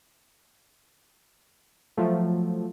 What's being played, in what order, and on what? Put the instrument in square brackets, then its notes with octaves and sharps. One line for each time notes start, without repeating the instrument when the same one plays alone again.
[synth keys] F3 F#3 A3